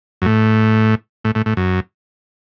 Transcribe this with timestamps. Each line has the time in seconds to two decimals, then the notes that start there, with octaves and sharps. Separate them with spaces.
0.22 F#2
0.26 A2
1.24 A2
1.35 A2
1.46 A2
1.57 F#2